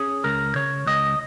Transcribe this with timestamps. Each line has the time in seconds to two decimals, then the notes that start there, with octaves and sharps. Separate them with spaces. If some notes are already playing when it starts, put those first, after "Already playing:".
Already playing: C#4 G#4
0.24 C#2 A#4
0.55 C#3 C#5
0.86 C#2 D#5